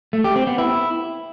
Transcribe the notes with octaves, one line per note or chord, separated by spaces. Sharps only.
A3
G4
C4
B3
E4